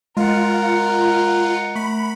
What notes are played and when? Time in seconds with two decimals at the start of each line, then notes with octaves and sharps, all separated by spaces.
0.17 G#3 F4 A#4 F#5
1.75 A3 B5